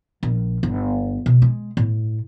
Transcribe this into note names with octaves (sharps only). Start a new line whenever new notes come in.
A#1
G1
B2
G#3
A2